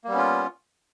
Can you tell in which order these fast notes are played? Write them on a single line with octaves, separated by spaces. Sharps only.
A#3 G3 B3 C#4 F4